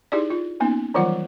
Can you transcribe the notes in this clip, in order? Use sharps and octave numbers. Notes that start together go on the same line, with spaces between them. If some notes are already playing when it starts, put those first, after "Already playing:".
D#4 E4 G4 G#4 D5
F4
A#3 B3 C#4 D#4
D#3 E3 F#3 G3 F4 F#5